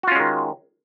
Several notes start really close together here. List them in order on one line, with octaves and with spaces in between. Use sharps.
F#4 F4 C#4 G#3 D#3